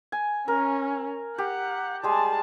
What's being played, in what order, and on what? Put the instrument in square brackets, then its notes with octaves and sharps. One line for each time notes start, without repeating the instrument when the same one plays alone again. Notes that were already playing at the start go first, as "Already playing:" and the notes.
[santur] G#5
[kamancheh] C#4 [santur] A#4
[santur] G4 [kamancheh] F#5
[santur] G3 G#3 G#5 [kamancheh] G#4 A5